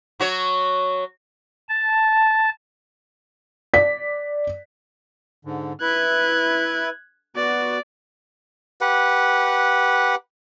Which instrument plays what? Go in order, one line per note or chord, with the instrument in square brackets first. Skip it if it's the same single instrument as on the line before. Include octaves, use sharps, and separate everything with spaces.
[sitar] F#3 F#4 C#5
[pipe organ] A5
[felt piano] D5 B6
[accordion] G#2 D3
[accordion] E4 B4 [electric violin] F#6 G#6
[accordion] B3 F#4 [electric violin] D5
[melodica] G4 B4 F#5